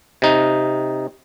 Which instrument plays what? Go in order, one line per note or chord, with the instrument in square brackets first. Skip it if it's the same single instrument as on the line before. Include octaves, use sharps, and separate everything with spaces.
[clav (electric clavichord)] C3 D#4